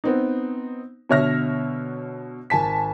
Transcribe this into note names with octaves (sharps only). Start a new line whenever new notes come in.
B3 C4 D#4
B2 D3 C#5 E5 F6 A#6
G#1 G#5 A5 B6